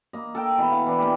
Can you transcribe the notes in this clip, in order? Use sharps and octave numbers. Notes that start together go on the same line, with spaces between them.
A#3 D#5
A4 A#4 G5
B2 E3
F5
E3 D4
A#3 G4